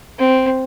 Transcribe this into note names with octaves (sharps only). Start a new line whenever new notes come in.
C4